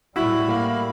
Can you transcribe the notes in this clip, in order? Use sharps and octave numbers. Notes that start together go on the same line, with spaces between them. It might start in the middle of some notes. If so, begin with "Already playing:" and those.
A2 G3 E4 F#4 B5
A#3 A#4 F5